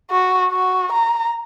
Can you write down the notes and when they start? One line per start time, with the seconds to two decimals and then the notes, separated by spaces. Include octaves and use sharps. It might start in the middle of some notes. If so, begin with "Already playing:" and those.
0.10 F#4
0.52 F#4
0.92 A#5